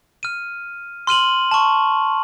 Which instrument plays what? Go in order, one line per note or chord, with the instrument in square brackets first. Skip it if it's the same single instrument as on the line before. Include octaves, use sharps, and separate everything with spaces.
[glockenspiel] F6 D#7
C6 F6 D#7 F#7
A5 C#6